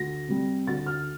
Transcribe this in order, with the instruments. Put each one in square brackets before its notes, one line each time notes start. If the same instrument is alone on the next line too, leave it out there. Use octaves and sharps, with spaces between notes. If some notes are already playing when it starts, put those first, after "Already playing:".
Already playing: [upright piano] D2 A#6
C3 G3
D2 A6
F6